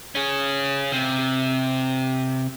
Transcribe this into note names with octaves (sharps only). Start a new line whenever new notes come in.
C#4 G#4
C3